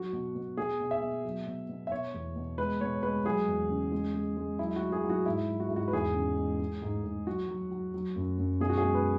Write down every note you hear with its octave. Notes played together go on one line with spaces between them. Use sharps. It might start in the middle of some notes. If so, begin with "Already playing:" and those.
Already playing: F#3 F#4
B2
B2
B2 G#4
B2
E5
B2
F#3
B2
B2
E5
B2 C#5
E2
B2
G#3 B4
B2 C#5
G#3 B4
F#3 G#4
E2
C#3
G#3
G#3
G#3
F#3 E4
F#3 F#4
G#4
F#3
F#4
G#2 E4
F#3
F#4
G#2 E4
F#4
B4
E2 G#4
C#3
G#3
G#3
G#2
G#2
F#3 F#4
F#3
F#3
F#3
F#2
F#2
B2 G#4
F#4
G#4
G#3
B4